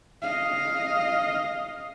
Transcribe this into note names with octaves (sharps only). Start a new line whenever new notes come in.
D#5 F5